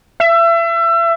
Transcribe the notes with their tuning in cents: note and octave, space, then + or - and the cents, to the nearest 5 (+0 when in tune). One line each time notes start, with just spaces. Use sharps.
E5 +30